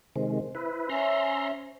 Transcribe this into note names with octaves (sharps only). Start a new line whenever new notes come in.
C3 D#3 G#3 C5
E4 B4
C#4 E5 A#5 C6